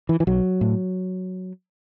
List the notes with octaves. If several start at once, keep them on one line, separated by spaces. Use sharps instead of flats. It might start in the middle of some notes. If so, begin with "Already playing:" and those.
E3
E3
B1 F#3
A2